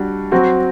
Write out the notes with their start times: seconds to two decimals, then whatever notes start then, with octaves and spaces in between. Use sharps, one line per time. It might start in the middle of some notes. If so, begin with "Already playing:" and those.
Already playing: G3 D4 F#4
0.32 F#3 C4 F#4